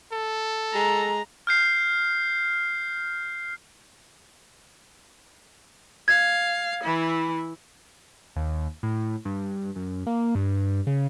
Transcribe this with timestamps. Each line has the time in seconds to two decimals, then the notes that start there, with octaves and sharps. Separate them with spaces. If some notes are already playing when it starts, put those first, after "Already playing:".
0.13 A4
0.75 G#3 A#5
1.47 F6 G6 C7
6.08 F5 G#6
6.83 E3 E4
8.36 D#2
8.83 A2
9.25 G2
9.76 F#2
10.07 A#3
10.35 G2
10.87 C#3